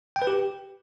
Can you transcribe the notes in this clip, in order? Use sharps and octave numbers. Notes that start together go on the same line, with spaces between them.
G5
B4
G4